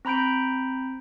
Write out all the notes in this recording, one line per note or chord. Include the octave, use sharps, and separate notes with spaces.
C4 A#5 B5 G6 D7